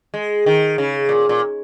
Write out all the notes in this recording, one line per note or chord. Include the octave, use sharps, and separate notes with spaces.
G#3
D#3
C#3
A#2
A#2